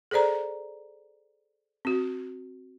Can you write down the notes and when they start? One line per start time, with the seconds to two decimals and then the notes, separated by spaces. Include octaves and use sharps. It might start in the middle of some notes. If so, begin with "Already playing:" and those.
0.11 G#4 A4 C5 D5 A#5
1.85 C4 F#4